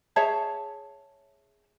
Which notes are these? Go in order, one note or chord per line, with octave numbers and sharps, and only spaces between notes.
G#4 C#5 E5 A5